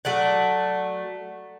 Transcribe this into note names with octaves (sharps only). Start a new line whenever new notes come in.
F#3 A3 D5 F#5